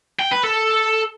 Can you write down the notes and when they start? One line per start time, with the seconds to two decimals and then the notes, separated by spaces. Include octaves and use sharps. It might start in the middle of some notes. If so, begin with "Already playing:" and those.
0.19 G5
0.31 B4
0.43 A4